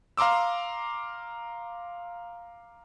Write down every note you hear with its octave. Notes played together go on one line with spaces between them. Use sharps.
F5 A#5 C6 D6 E6